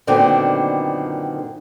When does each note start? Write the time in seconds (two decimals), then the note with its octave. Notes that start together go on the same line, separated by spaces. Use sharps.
0.07 F#2 A#2 D3 D#3 B3 C4